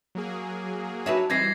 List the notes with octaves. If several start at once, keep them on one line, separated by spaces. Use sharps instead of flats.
F#3 A#3 G#4
D4 D#4 F#4 B4 C#5 E5
E3 G3 C4 D#4 D#5 G#6 A#6 C7